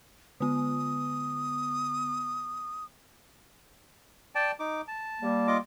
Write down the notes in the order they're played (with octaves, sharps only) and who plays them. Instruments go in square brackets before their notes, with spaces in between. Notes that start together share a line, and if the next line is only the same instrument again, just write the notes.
[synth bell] D3 B3 [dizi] D#6
[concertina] D5 G5 A5
D#4 D6
A5
[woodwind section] G3 A#3
[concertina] F4 D#5 D6